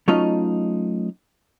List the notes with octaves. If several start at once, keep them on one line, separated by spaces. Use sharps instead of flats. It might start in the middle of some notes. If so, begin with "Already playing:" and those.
F#3 A3 C#4 D#4 F4 D#5